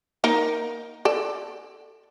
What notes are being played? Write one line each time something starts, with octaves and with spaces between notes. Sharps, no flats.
A#3 D#4 A#4
A4 D5